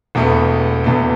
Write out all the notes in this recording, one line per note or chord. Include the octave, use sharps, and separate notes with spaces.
E1 E2 B2 A3
E1 E2 B2 A3